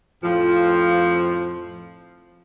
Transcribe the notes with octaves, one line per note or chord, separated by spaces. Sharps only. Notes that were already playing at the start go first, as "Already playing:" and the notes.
F2 A2 F3